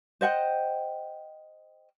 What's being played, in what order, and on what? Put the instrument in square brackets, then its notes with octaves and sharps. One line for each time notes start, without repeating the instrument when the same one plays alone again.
[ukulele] C5 D#5 F#5 G5